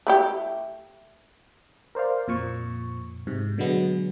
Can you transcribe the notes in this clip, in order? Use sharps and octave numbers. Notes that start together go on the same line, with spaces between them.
A3 E4 G4
A#4 C5 D5 F5
F2 A#2 F3 C#6
G#2 C3
B2 D3 F#3 G#3 B3